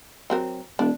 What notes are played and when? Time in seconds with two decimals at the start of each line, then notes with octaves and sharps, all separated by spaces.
0.30 F#3 C4 A#4
0.79 E1 D4